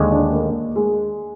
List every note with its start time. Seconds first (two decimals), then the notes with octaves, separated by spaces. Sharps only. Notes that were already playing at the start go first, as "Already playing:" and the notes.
Already playing: D#2 D3 G#3
0.12 D4
0.33 A#3
0.76 G#3